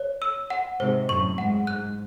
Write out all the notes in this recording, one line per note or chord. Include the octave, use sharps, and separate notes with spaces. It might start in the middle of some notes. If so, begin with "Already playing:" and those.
Already playing: C#5
E6
F#5
G#2 C3 C5
F#2 A2 C#6
G#2 F#5
F#6